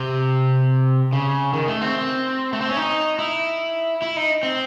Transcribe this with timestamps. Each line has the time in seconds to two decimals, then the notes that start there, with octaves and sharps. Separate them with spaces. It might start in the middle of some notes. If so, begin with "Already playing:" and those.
Already playing: C3
1.13 C#3
1.53 D#3
1.68 A3
1.82 C4
2.53 A3
2.61 C4
2.69 C#4
2.77 D#4
3.19 E4
4.02 E4
4.16 D#4
4.43 C4